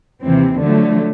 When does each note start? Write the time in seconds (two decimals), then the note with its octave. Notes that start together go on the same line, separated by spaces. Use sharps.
0.24 D#2 C3 E3 C4
0.59 D3 F3 F#3 A3